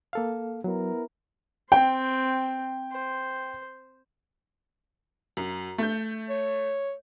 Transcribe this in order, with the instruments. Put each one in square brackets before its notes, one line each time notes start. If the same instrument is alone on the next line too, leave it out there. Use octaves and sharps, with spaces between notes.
[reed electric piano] A#3 A4 F5
[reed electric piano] F#3 [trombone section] B3 E4 A#4
[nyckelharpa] C4 C5 [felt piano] G5
[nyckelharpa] C5
[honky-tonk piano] F#2
A3 G6
[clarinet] C#5